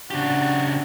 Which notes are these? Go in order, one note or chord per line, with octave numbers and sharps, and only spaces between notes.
C#3 D4 F#4 G4